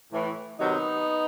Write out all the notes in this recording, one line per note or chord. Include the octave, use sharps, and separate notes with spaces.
A2 E3
C3 D#3 F#3 B3 D#4